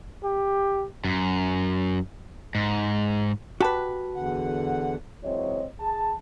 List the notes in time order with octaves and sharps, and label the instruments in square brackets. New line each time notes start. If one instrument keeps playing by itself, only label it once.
[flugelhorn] G4
[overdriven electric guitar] F#2
G#2
[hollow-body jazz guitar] F#4 A5 [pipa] G4 B4
[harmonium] E2 D3 F#5
[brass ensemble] C#2 E3 F#3 C4 C#5 D#5
G#4 A5